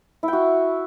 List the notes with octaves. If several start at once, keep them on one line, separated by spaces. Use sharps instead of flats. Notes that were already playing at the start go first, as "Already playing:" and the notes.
E4
G5
F#4